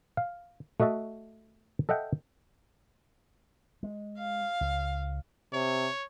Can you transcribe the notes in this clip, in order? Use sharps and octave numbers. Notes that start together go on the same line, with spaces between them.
F5
A3 F#4 D#5 E5 A5
A4 D#5 E5 F#5 G5
G#3
F5
C#2
C3 C#5